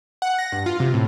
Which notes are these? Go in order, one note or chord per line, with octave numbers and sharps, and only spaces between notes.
F#5
A#6
G2
F4
C3
A2